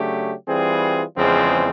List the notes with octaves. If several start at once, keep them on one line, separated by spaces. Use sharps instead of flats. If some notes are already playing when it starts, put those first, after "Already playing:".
Already playing: C#3 F#3 A3 D4 G4
E3 G3 C4 F4 G#4
E2 C#3 F3 G#3 C4